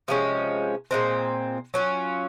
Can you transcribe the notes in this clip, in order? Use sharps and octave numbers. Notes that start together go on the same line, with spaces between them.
C3 F3 G#3 C#4
A#2 G#3 C4
F#3 C#4 F4